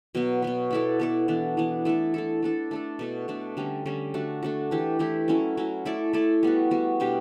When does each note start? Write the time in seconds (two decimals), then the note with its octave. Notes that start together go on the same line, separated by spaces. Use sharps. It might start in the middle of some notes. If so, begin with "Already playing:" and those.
0.15 B2 F#3 B3
0.42 B2 F#3 B3
0.71 B3 E4 A4 D5
0.99 B3 E4 A4 D5
1.28 E3 B3 D4
1.57 E3 B3 D4
1.85 A3 E4 A4
2.14 A3 E4 A4
2.43 A3 D4 A4
2.71 A3 D4 A4
2.99 B2 A3 D4
3.28 B2 A3 D4
3.57 D3 G3 C#4
3.86 D3 G3 C#4
4.14 A3 D4 F#4
4.43 A3 D4 F#4
4.71 E3 A3 E4 G4
4.99 E3 A3 E4 G4
5.28 F#3 C#4 E4
5.57 F#3 C#4 E4
5.85 A3 E4 A4 D5
6.13 A3 E4 A4 D5
6.43 G3 B3 F#4
6.71 G3 B3 F#4
7.00 B2 G3 D4 G4